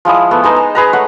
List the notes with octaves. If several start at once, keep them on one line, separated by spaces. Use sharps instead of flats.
F3 G#3 E4 D#6
A3 B3
G#3 B3 D#4 C5
A#5
G#4 B4 A#5
A3 C#5 F#5